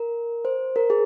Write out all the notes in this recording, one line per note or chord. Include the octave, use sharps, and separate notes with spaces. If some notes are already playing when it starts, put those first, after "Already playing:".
Already playing: A#4
C5
A#4
G#4